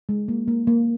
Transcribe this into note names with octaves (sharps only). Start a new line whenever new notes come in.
G#3
A#3
A#3
A#3